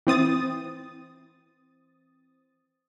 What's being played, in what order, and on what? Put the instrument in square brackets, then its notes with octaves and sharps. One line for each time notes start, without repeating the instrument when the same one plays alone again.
[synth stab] E3 C4 D#6 A6